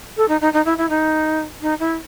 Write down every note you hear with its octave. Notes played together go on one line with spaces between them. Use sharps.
A4
D#4
D#4
D#4
E4
E4
D#4
D#4
E4